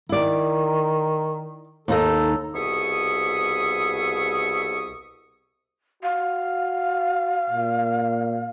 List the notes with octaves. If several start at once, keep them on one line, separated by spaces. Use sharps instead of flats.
D#3 E4 D5
D#2 D#4 A4 D#5
C2 B2 G#4 E5 C#6 D#6
F#4 F5
A#2